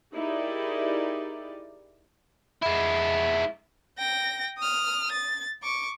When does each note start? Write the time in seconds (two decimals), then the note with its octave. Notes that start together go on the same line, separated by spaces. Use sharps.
0.13 D#4 E4 G4 G#4 A#4 D5
2.62 G#3 E4
3.98 G5 A#6
4.58 D#6 F6
5.12 A6
5.63 C#6 D6